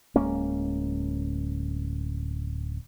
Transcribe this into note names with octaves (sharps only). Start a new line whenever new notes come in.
D1 G#3 A#3 C#4